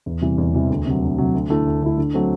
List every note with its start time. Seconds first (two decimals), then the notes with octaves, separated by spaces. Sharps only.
0.06 E2
0.22 C3 E3 G3
0.38 E2
0.54 C3 E3 G3
0.70 D2
0.86 C3 F#3
1.02 D2
1.18 C3 F#3
1.34 D2
1.50 D3 A3 E4
1.66 D2
1.82 D3 A3 E4
1.98 D3
2.14 F#3 A3 C4